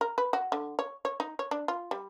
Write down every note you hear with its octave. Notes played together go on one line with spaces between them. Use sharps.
A#4
B4
F#4
D3
C#5
C#5
D#4
C#5
D4
F4
G3